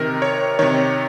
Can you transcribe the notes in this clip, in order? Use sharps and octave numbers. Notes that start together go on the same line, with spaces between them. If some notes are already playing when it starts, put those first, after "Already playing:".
Already playing: C3 D#3 A#4
C#5
C3 D#3 C#5